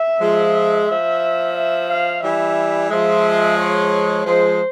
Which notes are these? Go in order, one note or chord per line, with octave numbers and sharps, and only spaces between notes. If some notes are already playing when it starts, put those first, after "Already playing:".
Already playing: E5
F3 G#3
F3 E5
E5
F5
E3 G3 E5
F3 G#3 E5
C#5
F3 G#3 C5